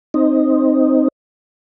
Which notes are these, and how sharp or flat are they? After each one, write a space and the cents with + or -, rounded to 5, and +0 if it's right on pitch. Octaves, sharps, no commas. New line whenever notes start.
C4 +5 D#4 +0